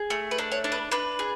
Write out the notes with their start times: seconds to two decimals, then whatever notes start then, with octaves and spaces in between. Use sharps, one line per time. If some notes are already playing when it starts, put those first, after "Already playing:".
Already playing: G#4
0.10 A3
0.31 B4
0.38 D4
0.52 C#5
0.64 D4
0.72 B4
0.92 D4 B4
1.19 G#4